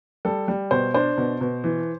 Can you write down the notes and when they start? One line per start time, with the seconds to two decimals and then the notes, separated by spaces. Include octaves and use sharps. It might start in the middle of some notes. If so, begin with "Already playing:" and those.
0.25 G3 A4
0.48 G3
0.71 B2 C5
0.94 D4 C5
1.18 B2
1.41 B2
1.64 E3